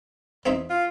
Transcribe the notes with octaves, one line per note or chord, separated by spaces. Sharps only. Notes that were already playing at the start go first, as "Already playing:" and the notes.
E2 C4 D#4 E5
F4